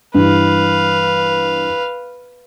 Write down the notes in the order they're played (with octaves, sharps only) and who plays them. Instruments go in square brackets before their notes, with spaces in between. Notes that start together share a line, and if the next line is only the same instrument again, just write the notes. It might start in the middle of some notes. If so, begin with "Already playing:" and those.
[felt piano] G2 E3 [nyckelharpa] B4 F5